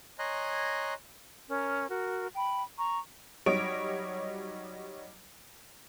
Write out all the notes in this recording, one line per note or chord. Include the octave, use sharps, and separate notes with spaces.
C#5 D#5 G#5 A#5 C6 F#6
C#4 A#4
F#4 A#4
G5 B5
A#5 C#6
F#3 G3 D#4 C#5 D#5 D7